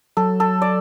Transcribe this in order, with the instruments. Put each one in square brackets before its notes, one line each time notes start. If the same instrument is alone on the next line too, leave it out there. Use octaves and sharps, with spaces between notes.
[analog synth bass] F#3 [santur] A4
[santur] A4
D5